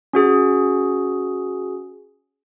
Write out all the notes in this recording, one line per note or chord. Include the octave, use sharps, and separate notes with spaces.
C#4 F#4 G#4